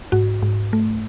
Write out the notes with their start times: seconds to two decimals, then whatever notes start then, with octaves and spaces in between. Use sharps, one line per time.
0.12 G#2 F#4
0.42 G#2
0.73 A3